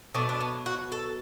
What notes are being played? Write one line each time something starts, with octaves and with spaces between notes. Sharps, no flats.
B2 F#3 A3 D4
D4
B3
F#4
A4